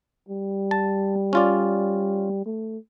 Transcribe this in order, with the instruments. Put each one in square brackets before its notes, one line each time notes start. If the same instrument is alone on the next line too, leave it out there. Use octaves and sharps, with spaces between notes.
[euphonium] G3
[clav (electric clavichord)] A5
C#4 F4 D5
[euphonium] A3